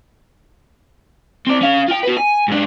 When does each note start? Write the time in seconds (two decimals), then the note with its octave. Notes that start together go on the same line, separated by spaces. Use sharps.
1.47 C4 D5
1.62 C#4 F5
1.88 F4 G5
2.03 F#4 B4
2.17 G#5
2.48 G#2 D4